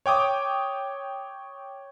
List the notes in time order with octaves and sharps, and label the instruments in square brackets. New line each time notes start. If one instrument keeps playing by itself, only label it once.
[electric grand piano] C#5 G5 D6 D#6